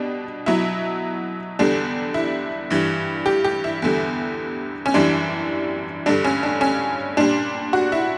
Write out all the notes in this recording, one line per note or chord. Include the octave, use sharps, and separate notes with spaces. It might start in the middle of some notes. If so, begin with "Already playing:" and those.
Already playing: B2 G3 D4
B2 F#3 E4
E2 D3 G3 D4
E4
G2 E3 G3
G4
G4
E4
E2 D3 G3
C#4
F#2 E3 G3 D4
G2 D3 G3 D4
C#4
D4
C#4
A#2 G3 D4
F#4
E4